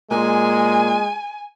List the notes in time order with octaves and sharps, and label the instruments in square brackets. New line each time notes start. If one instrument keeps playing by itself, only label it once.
[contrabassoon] A#2 [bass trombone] G#3 [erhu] G#5